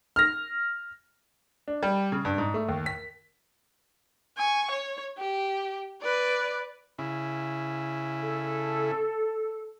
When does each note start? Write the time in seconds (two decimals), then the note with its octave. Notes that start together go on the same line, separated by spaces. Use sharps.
0.16 F6 A#6
1.68 D4
1.83 G3
2.12 C#3
2.25 G2
2.38 G#2
2.54 A3
2.69 D#2
2.86 B6
4.38 G#5 C#6
4.71 C#5
5.18 G4
6.02 B4 D5
6.98 C#3 E4
8.21 A4